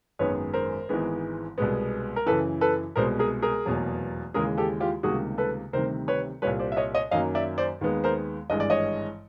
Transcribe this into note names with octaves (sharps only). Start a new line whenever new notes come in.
G#1 F#2 D#3 G#3 B3 B4 C#5
A#4 C5
G#1 G#2 E3 G#3 B3
C2 B2 G#3 B3
A#4
F#2 C#3 E3 A4 B4
A4 B4
C2 B2 G#3 B3 A#4 C5
G#4 A#4
G#4 A#4
F1 E2 B2 F#3 A#3
D#2 C#3 E3 G#3 G#4 A#4
G4 A4
F4 G4
C#2 C3 D#3 G3 A#3 F#4 G#4
A4 B4
D2 C3 D#3 G3 A#4 C5
B4 C#5
C2 A#2 G3 B4 C#5
C5 D5
E5
C#5 D#5
C#5 D#5
F#2 D#3 F#3 A#3 D#5 F5
D5 E5
C5 D5
D#2 D#3 G#3 B3
A#4 C5
G#1 G2 E3 G#3 D#5
D5
C#5 D#5